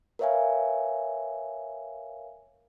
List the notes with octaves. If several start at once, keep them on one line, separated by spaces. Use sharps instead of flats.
A#4 B4 C#5 E5 F5 G#5